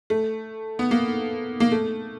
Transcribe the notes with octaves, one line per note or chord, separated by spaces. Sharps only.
A3
B3
A#3
A#3
A3